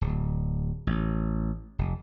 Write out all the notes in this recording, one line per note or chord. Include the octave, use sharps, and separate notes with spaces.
D1
A1
F1